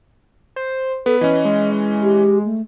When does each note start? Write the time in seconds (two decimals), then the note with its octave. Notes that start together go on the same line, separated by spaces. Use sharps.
0.56 C5
1.06 B3 A4 B4
1.21 E3 C#4 D#5
1.45 G#3
2.02 G4
2.46 A3